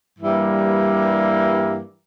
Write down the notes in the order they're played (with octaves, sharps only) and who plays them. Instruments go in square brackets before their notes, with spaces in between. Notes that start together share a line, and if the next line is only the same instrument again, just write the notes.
[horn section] G2 E3 G3 A#3